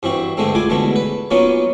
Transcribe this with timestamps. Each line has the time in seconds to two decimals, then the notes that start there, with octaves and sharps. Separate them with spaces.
0.03 G2 E3 C4 F#4
0.37 G2 D3 G#3 A3 C4
0.55 E4 F4 G#5 D6
0.70 B2 D3 E3 G#3 A3
0.96 B4
1.31 F#3 A#3 B3 C#4 D#4 F4